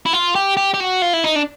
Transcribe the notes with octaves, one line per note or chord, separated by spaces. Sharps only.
E4
F4
G4
G4
G4
F#4
F4
E4
D#4
D4